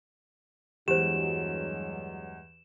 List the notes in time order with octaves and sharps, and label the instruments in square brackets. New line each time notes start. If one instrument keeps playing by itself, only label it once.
[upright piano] E2 [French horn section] G2 F#3 G#3 [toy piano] G4 C5 [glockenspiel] E7